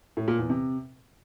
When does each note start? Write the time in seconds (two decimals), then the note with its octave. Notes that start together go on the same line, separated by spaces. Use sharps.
0.17 A2
0.28 A#2
0.39 E2
0.49 C3